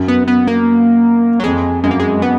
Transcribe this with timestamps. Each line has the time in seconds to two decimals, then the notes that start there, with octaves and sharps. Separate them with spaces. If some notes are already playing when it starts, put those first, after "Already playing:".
Already playing: F#2
0.08 B3
0.27 B3
0.47 A#3
1.40 F#3
1.44 F2 G#3
1.84 F#2 G#3
1.91 A#3
2.00 G#3
2.22 B3